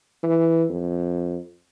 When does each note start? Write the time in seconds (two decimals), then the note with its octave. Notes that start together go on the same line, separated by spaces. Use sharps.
0.24 E3
0.70 F2